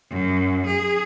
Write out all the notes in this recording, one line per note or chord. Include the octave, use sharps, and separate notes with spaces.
F#2
G#4